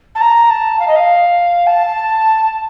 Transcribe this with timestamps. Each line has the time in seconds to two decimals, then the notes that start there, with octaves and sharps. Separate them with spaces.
0.15 A5
0.21 A#5
0.50 A5
0.79 F5
0.88 D#5
0.96 F5
1.67 A5